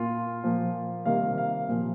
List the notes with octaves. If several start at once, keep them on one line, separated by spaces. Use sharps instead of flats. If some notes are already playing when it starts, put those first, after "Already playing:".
Already playing: A#2 A#3 F4
A#2 F3 A#3
C3 D#3 G3 A#3 F5
F5
A#2 F3 A#3